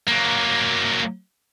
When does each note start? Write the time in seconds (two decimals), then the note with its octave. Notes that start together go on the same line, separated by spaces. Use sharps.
0.07 F#3 A#3